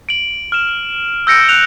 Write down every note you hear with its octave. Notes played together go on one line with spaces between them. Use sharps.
D7 F#7
F6 E7
E6 G6 A#6 C#7 D7
F#6 F7